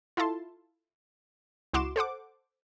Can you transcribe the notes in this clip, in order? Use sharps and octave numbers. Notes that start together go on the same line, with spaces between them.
E4 F4 A4 A5 C6
C#2 E4 F#4 C6 D6 E7
A4 C5 F#5 D6